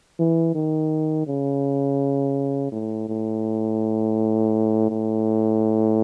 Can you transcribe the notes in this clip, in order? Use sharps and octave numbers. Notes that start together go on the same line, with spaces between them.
E3
D#3
C#3
A2
A2
A2